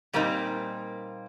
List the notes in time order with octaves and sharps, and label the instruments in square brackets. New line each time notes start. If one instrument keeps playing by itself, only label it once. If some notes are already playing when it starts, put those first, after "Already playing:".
[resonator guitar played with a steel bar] A#2 G3 A#3 C4 D#4